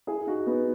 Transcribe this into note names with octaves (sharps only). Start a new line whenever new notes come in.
E4 G#4
D#4 F#4
B3 D#4